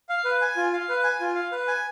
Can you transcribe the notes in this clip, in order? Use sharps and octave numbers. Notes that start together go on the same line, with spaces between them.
F5
B4
G#5
F4
F5
B4
G#5
F4
F5
B4
G#5